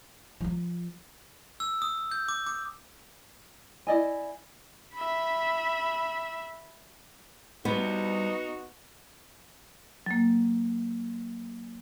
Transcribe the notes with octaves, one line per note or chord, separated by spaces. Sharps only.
F3 F4
E6
D#6
G6
D6
D6
E4 D5 D#5 G#5
E5 B5
G3 B3 D#4 F#4 C5
F#3 A#3